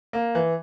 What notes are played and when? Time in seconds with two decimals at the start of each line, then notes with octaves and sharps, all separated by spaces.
0.13 A#3
0.35 E3